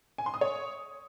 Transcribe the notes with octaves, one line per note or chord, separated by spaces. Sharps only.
G#5
C6
D#6
C#5